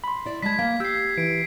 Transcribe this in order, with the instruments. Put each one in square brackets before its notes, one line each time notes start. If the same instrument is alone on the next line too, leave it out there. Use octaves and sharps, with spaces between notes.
[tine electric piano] B5 C6
[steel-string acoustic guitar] E4 D5
[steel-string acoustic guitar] G#3 A5 [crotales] G#6 B6
[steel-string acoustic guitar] A#3 [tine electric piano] F5
[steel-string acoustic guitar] G4 [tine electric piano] E6 G6 [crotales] B6 C7
[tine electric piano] E3 [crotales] D7